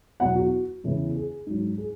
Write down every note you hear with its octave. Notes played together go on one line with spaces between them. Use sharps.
E2 B2 F#3 F#5
F#4
E2 C#3 E3
G#4
G#2 F#3
G#4